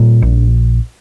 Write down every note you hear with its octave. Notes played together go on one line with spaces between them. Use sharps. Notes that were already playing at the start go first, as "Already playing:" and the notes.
Already playing: A#2 G3
A#1